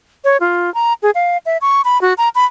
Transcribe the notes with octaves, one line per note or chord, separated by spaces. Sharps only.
C#5
F4
A#5
G#4
F5
E5
C#6
B5
F#4
A#5
B5